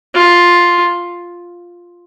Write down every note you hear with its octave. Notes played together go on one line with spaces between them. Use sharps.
F4